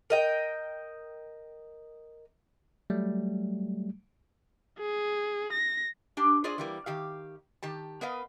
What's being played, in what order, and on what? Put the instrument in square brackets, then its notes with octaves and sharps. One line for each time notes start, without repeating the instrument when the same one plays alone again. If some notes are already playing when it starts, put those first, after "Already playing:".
[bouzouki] A#4 D#5 G5
[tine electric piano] F#3 G3 A3
[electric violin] G#4
A#6
[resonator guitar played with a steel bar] D4 G4
F4 G#4 C5 D5 D#5
E3 G3 A#3
D#3 G4 F5
D#3 G4 A5
B3 A#4 B4 D#5 F5